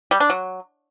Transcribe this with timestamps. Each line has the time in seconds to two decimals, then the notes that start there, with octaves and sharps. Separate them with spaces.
0.11 G3
0.20 D4
0.30 F#3